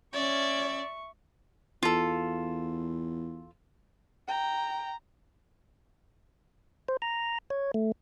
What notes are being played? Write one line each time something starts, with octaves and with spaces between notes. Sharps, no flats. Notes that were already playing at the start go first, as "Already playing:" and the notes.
C#4 D5 E5 C#6
E2 F4 A4
G5 A#5
C5
A#5
C#5
A3